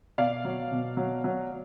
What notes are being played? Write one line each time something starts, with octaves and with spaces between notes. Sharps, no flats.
B2 D5 F5
F#3
B2
F#3
F#3